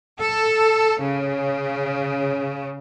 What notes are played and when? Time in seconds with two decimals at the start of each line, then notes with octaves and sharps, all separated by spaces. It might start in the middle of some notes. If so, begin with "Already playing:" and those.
0.20 A4
1.02 C#3